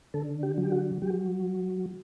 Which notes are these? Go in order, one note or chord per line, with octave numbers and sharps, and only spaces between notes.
D3 A4
G4
F#3
G4
F#4
F#3 G4